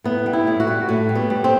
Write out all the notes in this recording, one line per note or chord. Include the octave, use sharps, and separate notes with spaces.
A2 B3
G3
E4
A2
F#4
G3
A2 F#4
G3
B3
G3
C4